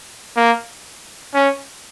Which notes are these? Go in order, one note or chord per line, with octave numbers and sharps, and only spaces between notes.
A#3
C#4